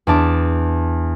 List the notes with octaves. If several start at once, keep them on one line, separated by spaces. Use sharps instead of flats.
E2 D4 A5 D6